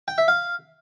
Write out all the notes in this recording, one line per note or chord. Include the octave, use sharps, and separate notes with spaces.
G5
E5
F5